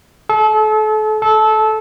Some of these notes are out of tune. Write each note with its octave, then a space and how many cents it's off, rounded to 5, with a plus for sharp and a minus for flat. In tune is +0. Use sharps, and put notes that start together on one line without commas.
A4 -35
A4 -20